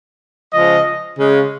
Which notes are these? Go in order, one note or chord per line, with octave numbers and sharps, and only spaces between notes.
C#3 F3 G#3 D#5
C#3 G#3